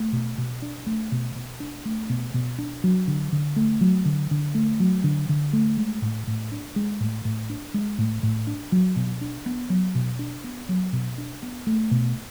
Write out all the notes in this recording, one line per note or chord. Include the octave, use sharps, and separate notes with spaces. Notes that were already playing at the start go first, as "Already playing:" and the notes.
Already playing: A3
B2
B2
D4
A3
B2
B2
D4
A3
B2
B2
D4
F#3
D3
D3
A3
F#3
D3
D3
A3
F#3
D3
D3
A3
G#3
A2
A2
D4
G#3
A2
A2
D4
G#3
A2
A2
D4
F#3
B2
D4
B3
F#3
B2
D4
B3
F#3
B2
D4
B3
A3
B2